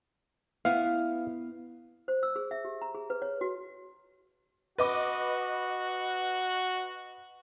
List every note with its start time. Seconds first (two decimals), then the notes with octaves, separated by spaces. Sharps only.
0.65 B3 E4 F5
2.08 C5
2.23 E6
2.36 G#4
2.51 E5
2.65 G4
2.82 A#5
2.95 G#4
3.10 B4
3.22 C#5
3.41 F#4
4.78 F#4 B4 D#5 D6